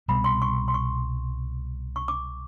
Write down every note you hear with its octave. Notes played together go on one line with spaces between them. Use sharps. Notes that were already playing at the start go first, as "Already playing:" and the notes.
C2 B2 G3 B3 B5
C6
C#6
C6
C#6
C#6
D6